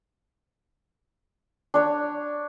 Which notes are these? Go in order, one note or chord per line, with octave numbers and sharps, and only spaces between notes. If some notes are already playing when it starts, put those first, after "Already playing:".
D4 C#5